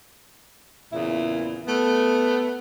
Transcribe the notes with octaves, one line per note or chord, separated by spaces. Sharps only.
E2 A#2 C#3 E4
A3 B3